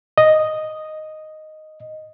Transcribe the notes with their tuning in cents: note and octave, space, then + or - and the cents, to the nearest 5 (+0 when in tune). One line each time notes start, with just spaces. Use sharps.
D#5 -5